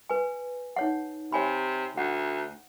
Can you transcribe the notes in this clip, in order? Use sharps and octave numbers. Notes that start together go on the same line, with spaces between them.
B4 G#5
D#4 C#5 F#5
C3 C#5 G#5 B5
D2 F#5